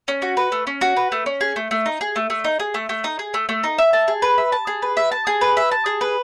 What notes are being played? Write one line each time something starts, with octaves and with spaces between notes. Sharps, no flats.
C#4
F#4
B4
A3
C#4
F#4
B4
A3
C#4
G#4
A3
A3
D#4
G#4
A3
A3
D#4
G#4
A3
A3
D#4
G#4
A3
A3
D#4
E5
A5
G#4
B4
E5
A5
G#4
B4
E5
A5
G#4
B4
E5
A5
G#4
B4